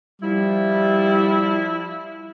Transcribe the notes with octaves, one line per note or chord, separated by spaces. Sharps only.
F3 G3 E4